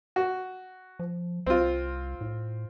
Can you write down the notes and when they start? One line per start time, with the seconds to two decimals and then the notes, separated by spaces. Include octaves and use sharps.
0.16 F#4
0.99 F3
1.46 C2 C4 F4
2.21 A2